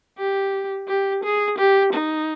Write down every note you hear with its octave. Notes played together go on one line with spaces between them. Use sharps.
G4
G4
G#4
G4
D#4